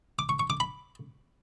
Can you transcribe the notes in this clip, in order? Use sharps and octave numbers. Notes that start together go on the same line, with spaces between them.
D6
C#6
C#6
D6
B5